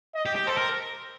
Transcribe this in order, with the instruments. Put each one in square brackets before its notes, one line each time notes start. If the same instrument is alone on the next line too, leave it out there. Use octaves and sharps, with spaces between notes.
[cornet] D#5
[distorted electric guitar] G4
G4
[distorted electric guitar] A4 [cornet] C5
[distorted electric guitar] A#4